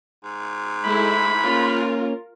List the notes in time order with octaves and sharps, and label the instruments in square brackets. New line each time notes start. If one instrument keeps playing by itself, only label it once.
[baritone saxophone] G#2
[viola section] G#3 A3 E4 [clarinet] B5
[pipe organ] A#3 C#4 [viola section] F4 A#4